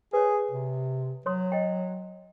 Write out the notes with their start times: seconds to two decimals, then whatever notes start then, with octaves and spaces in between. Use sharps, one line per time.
0.13 G#4 B4 C#5
0.51 C3
1.26 F#3 C#5 C6 D#6
1.52 D#5 G5